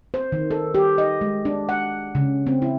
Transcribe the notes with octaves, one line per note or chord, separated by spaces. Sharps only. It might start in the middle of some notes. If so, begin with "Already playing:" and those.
C5
D#3
A4
G4
D#5
G#3
D4
F#5
C#3
C4
E4